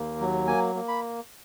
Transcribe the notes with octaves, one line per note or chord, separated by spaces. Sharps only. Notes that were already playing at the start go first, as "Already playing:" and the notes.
Already playing: D#2 A#3
F#3
A#3 G#5
A#3
B5